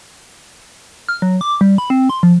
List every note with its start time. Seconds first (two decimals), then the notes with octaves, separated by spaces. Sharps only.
1.09 F6
1.22 F#3
1.41 D6
1.61 G3
1.78 B5
1.90 C4
2.10 C6
2.23 F3